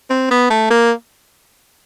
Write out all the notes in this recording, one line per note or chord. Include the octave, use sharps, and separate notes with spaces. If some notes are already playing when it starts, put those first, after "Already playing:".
C4
B3
A3
A#3